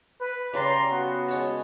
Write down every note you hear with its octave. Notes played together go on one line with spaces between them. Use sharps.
B4
C#3 G3 D5 A#5 C6
B3 F#4
G#3 C#5 A5